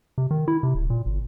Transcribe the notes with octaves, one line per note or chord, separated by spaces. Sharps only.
C3
D#3
E4
C3
D1
A#2
G1